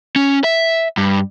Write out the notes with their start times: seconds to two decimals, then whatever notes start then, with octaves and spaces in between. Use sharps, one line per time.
0.16 C#4
0.44 E5
0.98 G2